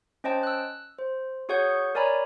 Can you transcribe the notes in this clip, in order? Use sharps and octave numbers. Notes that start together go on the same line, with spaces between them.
C#4 C5 D#5 G5 A5
E6 F#6
C5
F#4 G#4 C#5 F#5 C#6 G6
A#4 C#5 D5 G#5 A#5 B5